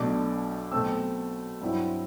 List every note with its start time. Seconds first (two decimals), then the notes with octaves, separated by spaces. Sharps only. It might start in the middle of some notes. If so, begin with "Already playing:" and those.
Already playing: B1 B2 A3 D4 D6
0.72 B1 B2 A3 C4 E6
1.62 G2 F#3 C4 E4